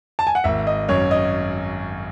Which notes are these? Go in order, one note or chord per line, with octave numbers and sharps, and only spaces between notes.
A5
G#5
F#5
G#1 E5
D#5
F#2 C#5
D#5